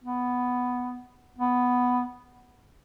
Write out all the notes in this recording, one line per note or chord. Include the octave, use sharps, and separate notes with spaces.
B3
B3